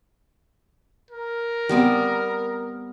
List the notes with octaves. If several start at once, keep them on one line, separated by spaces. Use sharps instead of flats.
A#4
G3 B3 C4